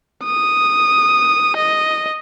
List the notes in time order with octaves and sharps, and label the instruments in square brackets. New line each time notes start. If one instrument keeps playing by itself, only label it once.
[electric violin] D#6
D#5